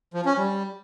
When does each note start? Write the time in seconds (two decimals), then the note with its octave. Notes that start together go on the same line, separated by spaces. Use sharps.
0.14 F3
0.26 C#4
0.37 G3